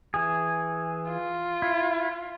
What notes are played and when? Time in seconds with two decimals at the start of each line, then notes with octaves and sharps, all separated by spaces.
0.14 E3 G#4
1.10 F4
1.62 E4